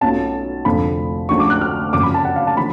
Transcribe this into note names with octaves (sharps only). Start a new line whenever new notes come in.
B1 B2 A3 C#4 F4 A5
F1 F2 D3 F3 A3 B5
D2 D3 F3 G#3 C#4 C#6
D6
F#6
F6
F#2 C#3 F3 D6
B5
A5
F#5
F5
A5
D3 F3 B5